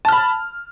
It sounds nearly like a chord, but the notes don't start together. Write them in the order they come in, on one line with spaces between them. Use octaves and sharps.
A5 F6 B5